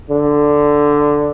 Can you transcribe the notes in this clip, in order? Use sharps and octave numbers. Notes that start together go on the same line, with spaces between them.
D3